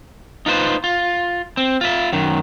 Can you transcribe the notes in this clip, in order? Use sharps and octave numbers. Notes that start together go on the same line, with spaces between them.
D#4 F4 B4 C5
F4
C4
F4 E5
F#2 D#3